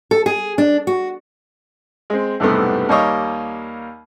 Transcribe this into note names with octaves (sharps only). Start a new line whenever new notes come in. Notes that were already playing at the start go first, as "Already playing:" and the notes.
A4
G#4
D4
F#4
G#3 C4
B1 E2 G2 C3 A3 B3
D#2 G3 A#3 C#5 D#5 C#6